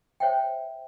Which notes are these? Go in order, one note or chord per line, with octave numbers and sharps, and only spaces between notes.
C5 C#5 E5 F#5 G5